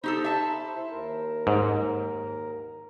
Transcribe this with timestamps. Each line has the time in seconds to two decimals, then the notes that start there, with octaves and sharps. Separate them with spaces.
0.04 D#4 G4 A4 C5 B5
0.24 E5 A5
0.75 E4 C5
0.91 D#2 A#4
1.47 G#2